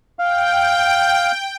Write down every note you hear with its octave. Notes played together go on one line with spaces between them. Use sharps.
F5 G5